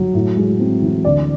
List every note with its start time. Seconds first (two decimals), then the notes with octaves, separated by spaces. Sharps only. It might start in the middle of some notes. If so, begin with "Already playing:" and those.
Already playing: F#3
0.14 A2
0.37 G#3
0.59 C4
0.82 E3
1.05 D2 D5